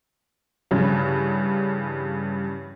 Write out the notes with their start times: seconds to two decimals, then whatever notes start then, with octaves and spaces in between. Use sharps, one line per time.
0.71 G2 C#3 E3 C#4